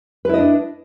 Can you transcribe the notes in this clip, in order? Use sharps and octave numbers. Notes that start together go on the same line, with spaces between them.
D4 E4 B4 D#5